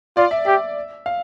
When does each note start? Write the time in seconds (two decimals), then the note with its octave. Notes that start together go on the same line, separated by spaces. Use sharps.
0.17 F4 D5
0.31 E5
0.46 G4 E5
1.06 F5